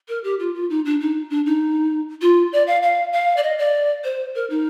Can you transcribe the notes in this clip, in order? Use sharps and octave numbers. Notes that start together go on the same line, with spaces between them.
A#4
G4
F4
F4
D#4
D4
D#4
D4
D#4
F4
D5
F5
F5
F5
D5
D#5
D5
C5
A#4
D#4